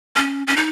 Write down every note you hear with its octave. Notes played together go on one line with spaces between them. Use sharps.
C#4
C#4
D#4